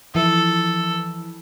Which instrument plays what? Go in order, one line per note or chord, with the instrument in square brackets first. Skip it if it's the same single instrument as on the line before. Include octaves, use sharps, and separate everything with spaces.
[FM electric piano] E3 F3 E4 [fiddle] A4